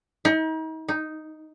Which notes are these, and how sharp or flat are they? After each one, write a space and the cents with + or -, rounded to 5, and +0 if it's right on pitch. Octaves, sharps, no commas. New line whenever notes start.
D#4 +40
D#4 +0